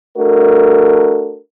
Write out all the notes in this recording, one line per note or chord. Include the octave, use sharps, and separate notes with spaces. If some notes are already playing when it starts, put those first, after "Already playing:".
A3 D4 F#4 A4 A#4